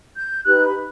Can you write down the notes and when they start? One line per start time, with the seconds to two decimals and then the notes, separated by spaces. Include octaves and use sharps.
0.15 G6
0.46 D#4 G4 B4 F#6
0.65 B5